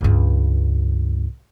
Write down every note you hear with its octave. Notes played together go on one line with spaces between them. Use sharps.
C#2 G2